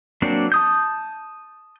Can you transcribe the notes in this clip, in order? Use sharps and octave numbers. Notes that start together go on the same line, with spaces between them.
F#3 A#3 C4 D4
A5 D#6 G6